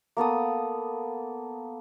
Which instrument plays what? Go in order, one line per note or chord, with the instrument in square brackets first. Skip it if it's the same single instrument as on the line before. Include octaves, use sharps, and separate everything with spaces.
[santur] A#3 B3 A4 D#6